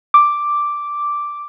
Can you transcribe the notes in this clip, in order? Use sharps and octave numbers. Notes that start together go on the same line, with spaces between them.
D6